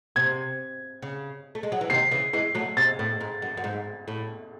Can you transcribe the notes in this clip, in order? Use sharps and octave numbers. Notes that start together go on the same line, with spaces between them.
C3 G#6
C#3
A3
G#3
F#3
E3
C3 D#3 C7
C#3 E3
E3 G#3 C7
F#3 A3
C3 A6
A2
G#2
F#2
F#2
G#2
A2